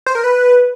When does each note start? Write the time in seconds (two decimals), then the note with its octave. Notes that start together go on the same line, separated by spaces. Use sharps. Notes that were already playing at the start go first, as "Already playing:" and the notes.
0.06 C5
0.15 A#4
0.24 B4